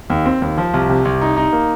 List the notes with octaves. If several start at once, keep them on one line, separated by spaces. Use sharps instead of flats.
D#2
C4
D#2
F3
C2
C3
C2
D#4
D#4
A#3